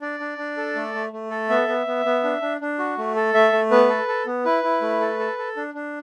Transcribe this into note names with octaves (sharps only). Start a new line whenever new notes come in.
D4 D5
D4
D4
A4
A3
A3
A3
A4
B3 E5
B3
B3
B3
D4
D4
D4
F#4
A3
A4
A3 E5
A3
B3 B4
A4
A4
B3
E4 B4
E4
A3
A4
A4
A4
D4
D4